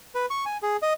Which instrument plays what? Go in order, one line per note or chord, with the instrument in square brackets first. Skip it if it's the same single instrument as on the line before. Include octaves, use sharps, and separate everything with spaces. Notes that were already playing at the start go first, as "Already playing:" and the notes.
[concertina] B4
C#6
G#5
G#4
D#5